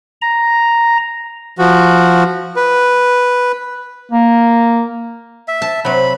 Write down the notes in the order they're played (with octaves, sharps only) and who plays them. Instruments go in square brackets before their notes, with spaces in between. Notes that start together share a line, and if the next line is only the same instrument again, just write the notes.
[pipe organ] A#5
[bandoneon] F3 F#4
B4
[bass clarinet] A#3
[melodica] E5
[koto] A5
[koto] C3 F#3 [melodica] B5